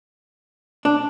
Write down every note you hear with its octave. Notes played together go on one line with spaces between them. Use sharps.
D4